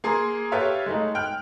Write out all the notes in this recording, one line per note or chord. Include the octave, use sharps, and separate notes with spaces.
A#3 G#4 A#5 C6
G4 A4 B4 C#5 E5 F5
G#3 A3 D#4
G5 F6 F#6